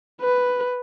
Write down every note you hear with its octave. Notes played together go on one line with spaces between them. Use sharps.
B4